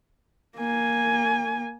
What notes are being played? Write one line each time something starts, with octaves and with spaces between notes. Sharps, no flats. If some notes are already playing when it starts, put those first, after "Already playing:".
A#3 G#5